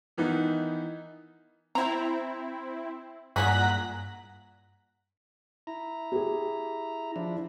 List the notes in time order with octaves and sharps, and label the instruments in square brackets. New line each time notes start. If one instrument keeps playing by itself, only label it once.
[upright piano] D#3 E3 B3 D#4
[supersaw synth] C4 E4 [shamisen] A#5
[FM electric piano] G2 [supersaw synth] A#2 B6 [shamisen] G#3 E4 G#4 [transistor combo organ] F#5 A#5
[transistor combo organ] E4 A#5
[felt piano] G4 G#4
[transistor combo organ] F3 D4 E4